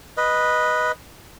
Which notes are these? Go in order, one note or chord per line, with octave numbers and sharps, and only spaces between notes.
B4 D#5